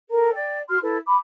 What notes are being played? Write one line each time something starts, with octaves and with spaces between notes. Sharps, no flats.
A4 A#4 A#5
D5 G5
F#4 C6 F6
E4 A4 B4
B5 D6